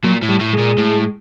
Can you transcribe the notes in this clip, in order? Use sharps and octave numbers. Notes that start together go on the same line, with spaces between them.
A#2 F#3
A2
G3
A2
G#3
A#2
A2